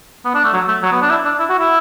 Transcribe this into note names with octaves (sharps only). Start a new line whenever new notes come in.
B3
D4
A3
F#3
A3
F#3
B3
D4
E4
D4
E4
F#4
E4